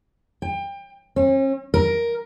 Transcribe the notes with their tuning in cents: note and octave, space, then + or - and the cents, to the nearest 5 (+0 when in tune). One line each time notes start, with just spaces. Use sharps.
G5 +25
C#4 -45
A#4 +5